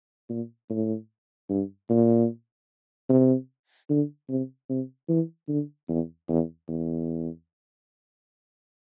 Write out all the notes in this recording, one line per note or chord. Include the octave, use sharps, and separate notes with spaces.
A#2
A2
G2
A#2
C3
D3
C3
C3
E3
D3
E2
E2
E2